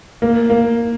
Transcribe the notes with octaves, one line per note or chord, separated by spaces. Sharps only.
A#3
A#3